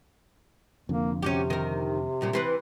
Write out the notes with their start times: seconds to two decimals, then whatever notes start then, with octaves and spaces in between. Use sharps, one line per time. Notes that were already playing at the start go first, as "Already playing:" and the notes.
0.89 F1 F2 D3 A#3
1.23 C3 C#4 F#4 G4
1.50 D#3 A#4
2.21 F#2 A#2 G3
2.33 E3 C4 B4